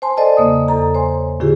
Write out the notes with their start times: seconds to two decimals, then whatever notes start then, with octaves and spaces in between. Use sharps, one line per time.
0.02 C5 G#5 A5 C6
0.17 A4 C5 D5 D#5 G#5 A5
0.37 E2 C#3 A#3 C5 D#6
0.68 E2 A4 A#5
0.94 C5 C#5 G#5 C6
1.40 A2 D3 E4 F4 G4 G#4